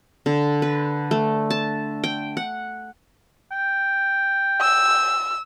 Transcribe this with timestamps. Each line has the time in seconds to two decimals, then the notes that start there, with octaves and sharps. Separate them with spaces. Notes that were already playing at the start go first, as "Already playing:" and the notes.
0.26 D3
0.62 B4
1.11 A3
1.50 A5
2.04 G5
2.37 F#5
3.52 G5
4.61 E6